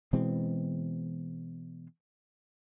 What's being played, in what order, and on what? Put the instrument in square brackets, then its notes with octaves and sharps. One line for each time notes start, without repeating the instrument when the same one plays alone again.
[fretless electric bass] B2 E3 G#3 C4